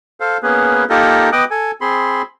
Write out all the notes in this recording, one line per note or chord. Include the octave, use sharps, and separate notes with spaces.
A4 C5 F5
A#3 B3 C#4 G#4 B4
A#3 D#4 F4 G4 A4 A#4
B3 D#5 G5 D6 D#6 F#6
A4 G#5
C4 G#4 B5 C6